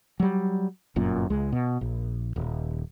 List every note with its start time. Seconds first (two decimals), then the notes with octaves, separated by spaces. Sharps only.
0.20 F#3 G3
0.96 G1 F#2 A#2
1.30 C#2 G#3
1.52 B2
1.81 A#1
2.36 D#1